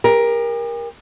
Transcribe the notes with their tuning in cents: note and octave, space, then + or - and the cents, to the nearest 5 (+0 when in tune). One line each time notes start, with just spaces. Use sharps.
G4 +45 A#4 +15